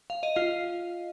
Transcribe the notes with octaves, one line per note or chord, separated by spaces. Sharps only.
F5
D#5
F4 F5